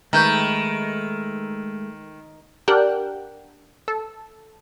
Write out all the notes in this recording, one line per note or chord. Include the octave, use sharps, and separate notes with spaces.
D#3 G#3 A3 B4 A#5 C#6 G6
D4 G4 A#4 F#5 G5
A4